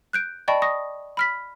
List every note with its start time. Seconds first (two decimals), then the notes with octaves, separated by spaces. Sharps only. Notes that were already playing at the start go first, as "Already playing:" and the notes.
0.13 F#6 G6 D7
0.48 D5 D#5 G5 A5 B5 C#6
0.62 C#6 D#6 A#6
1.17 B5 F6 B6